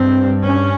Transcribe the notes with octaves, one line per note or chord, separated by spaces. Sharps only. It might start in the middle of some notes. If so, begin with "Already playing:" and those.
Already playing: G2 C4
C#4